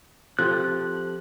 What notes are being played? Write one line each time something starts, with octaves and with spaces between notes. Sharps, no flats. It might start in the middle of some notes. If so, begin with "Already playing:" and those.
F3 C4 G4 A4 F#6